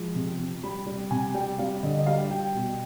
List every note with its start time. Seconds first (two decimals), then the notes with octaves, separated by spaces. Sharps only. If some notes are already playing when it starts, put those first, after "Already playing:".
Already playing: F3 G#3
0.15 C3
0.39 C3
0.63 G3 B5
0.86 G3
1.11 C3 G#5
1.34 G3 G5
1.59 G3 F5
1.83 D3 D#5
1.99 D#5
2.07 G3 F5
2.31 G3 G5
2.55 B2